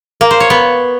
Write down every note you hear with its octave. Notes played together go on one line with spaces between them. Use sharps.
A#3
C5
C#5
B3